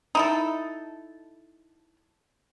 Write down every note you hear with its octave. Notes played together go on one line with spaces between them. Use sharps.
D#4 E4 A4